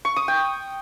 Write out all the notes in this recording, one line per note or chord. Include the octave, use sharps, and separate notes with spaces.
C#6
D#6
G5